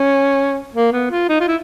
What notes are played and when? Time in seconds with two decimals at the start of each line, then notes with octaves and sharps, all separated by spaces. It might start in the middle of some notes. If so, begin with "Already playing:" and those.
Already playing: C#4
0.75 A#3
0.93 B3
1.11 F4
1.29 D#4
1.40 F4
1.48 E4